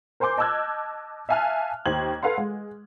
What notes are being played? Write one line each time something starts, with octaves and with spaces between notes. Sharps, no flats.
A#4 C5 G#5 C6 D6 G6
D#5 A5 D6 E6 F#6 G#6
E5 F5 G#5 A5 F6 F#6
D#2 C5 G#6 F#7
A4 B4 F5 F#5 C6
G#3